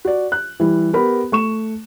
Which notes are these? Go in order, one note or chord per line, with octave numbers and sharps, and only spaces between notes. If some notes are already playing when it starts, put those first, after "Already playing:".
F#4 D5
F#6
E3 G3 E4
B3 G4 A#4 B5
A3 C#6 E7